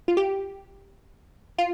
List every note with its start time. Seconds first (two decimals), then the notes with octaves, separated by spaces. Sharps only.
0.08 F4
0.17 G4
1.58 F4